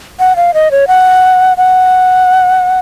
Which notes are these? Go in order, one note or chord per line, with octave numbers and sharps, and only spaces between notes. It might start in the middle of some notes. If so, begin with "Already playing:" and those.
F#5
F5
D#5
C#5
F#5
F#5